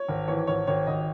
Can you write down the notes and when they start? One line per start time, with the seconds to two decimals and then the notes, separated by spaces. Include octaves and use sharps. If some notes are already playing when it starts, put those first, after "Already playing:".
Already playing: C#5
0.08 G#1
0.28 E3 C#5
0.47 G#1 C#5
0.67 G#1 C#5
0.87 G#1 D#5